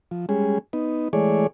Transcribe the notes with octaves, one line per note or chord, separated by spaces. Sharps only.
F3
G3 G#3 C#4 G#4
B3 D#4
E3 G#3 A3 G#4 C#5 D5